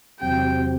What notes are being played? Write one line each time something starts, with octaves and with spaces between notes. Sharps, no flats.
E2 C3 F#3 C4 G4 G5